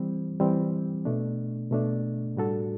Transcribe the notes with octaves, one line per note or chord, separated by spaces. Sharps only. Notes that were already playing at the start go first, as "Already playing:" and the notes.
Already playing: E3 G3 C4
E3 G3 C4
B2 A3 D4
B2 A3 D4
A2 G3 D4 F#4 A4